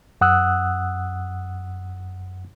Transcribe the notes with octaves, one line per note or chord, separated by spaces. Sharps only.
F#2 F#5 D#6 E6 F#6